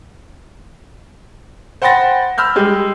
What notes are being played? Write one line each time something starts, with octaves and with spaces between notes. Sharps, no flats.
C5 F#5 G5 B5 A6 A#6
B5 E6 F6 G6
G3 G#3 G4